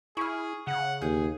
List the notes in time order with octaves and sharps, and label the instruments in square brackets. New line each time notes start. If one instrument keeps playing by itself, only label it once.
[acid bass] E4 [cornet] G#4 [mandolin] C#6 F6
[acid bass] C#3 [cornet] F#5
[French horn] D#2 [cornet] G#4 [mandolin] G6